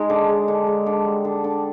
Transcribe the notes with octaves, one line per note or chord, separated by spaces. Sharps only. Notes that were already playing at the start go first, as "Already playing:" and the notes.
Already playing: G#3 D#4
D3
G#3
D3
G#3
D3
G3
D3
D3